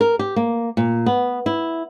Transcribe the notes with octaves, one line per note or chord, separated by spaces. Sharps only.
A#4
G4
A#3
A#2
B3
E4